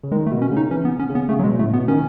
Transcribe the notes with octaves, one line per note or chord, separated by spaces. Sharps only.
C#3
D#3 G#3
A3
B2
C#4
C#3
D#4
E3 C#4
B3
C#4
C#3
B3
C#3 A3
F#3
B2 G#3
A2 A3
B2 B3
D#3 C#4